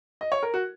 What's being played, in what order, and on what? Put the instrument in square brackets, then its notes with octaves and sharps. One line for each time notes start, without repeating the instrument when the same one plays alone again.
[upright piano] D#5
C#5
A#4
F#4